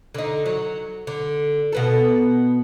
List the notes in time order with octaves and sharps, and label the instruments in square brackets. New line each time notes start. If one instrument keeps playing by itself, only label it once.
[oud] D3 D#4
F#3
D3
B2 B3 A4